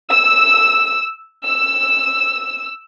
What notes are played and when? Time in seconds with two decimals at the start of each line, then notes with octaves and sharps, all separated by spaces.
0.12 E6
1.47 E6